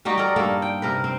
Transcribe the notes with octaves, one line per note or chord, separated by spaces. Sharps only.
G3 D#4 F#4 G4
D#4 A4 A#4 D5
G2 A#3 A4 A#4
G5
C3 A#4 B4
C4